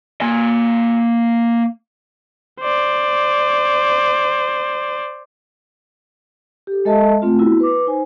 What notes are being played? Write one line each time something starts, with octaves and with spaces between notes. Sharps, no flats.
A#3 G#5
C5 D5
G4 A4
G#3 A4 D#5 E5 A5
A3 C4 F4
B3 E4 F#4
B4 D6
D#4 C5 G#5